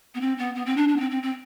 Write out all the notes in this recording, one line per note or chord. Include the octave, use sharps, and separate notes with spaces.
B3
C4
B3
B3
C4
D4
D4
B3
C4
C4
C4